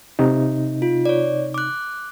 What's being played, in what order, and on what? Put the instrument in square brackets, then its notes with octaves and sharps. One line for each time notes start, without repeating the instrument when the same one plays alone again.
[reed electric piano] C3 D#4
[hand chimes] F4
C#5 D5
D6 F#6